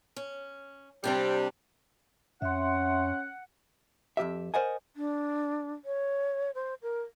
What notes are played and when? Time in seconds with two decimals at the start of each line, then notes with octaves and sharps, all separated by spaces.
0.16 C#4
1.04 C3 G3 C4 D4 G4
2.42 F2 C#4 E5 F#5 C6
4.17 F2 C3 G4 E5
4.54 A#4 C5 D5 D#5 F#5 G#5
4.96 D4
5.85 C#5
6.55 C5
6.82 A#4